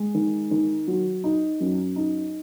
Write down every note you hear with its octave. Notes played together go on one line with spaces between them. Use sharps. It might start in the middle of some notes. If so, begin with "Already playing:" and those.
Already playing: G#3
D#3
D#3
F#3
D#4
F#2
D#4